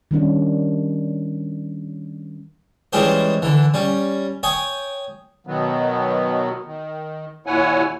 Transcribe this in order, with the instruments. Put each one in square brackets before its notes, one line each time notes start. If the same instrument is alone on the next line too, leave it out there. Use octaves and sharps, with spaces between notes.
[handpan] D#3 G3 C#4 D4
[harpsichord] E3 G3 G#3 C#4 G4 C5
D3 E3
G3 C#4
C#5 G5 G#5 D#6
[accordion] B2 D#3 F#3 B3
D#3
D#2 A#2 E4 C#5 F#5 G#5